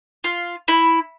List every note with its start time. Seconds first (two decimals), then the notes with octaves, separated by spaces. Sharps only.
0.24 F4
0.68 E4